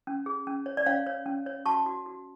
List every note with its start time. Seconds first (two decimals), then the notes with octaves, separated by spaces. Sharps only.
0.07 C#4
0.26 G#4
0.47 C#4
0.66 C#5
0.77 D5
0.86 C#4 C#5 F5
1.06 C#5
1.26 C#4
1.46 C#5
1.66 F#4 A5 C#6
1.86 F#4
2.06 F#4